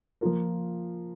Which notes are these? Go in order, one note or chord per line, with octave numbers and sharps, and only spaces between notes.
F3 A#3 F4 A#4